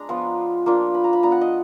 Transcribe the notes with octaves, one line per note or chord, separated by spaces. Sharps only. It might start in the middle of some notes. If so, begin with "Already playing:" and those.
Already playing: G#3 D4 A#5
F3 B3 F4
F3 A#3 D4 F4
B5
A#5
B5
F3 B3 D4 A#5
F#5
D#5